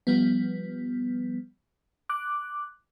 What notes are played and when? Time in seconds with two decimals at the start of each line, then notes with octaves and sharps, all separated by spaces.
0.07 F3 G3 B3
2.09 D6 F#6